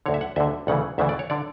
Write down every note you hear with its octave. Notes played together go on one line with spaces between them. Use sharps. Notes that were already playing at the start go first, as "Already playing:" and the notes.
D2 D3 C#5
E5
F#5
D2 D3 E5
D2 C#3 E3 F#5
D2 C#3 E3 E5
D5
C#5
D3 D5